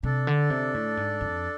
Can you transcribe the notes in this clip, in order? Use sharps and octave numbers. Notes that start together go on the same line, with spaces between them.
C3 D4 A4 D5
D3
C3
A2
G#2
F2